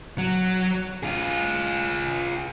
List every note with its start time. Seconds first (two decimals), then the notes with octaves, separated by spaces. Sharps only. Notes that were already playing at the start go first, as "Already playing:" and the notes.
0.18 F#3
1.03 F4 G#4